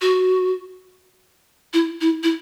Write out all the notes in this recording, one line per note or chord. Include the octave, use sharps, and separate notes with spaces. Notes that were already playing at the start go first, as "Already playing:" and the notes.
F#4
E4
E4
E4